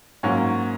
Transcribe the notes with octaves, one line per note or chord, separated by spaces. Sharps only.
G#2 F#3 A#3 C#4